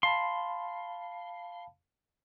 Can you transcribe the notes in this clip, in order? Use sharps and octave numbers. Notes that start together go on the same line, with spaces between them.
F5 A5 B5 C6